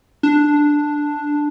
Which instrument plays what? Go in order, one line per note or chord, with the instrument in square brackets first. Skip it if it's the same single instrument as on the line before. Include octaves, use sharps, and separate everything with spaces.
[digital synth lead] D4